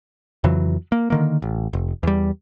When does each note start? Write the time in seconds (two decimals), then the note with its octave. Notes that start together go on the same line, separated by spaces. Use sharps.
0.44 F2 C#3 E3 F#3
0.92 A#3
1.10 D3 D#3 A#3
1.42 A1
1.73 F1
2.03 E2 G3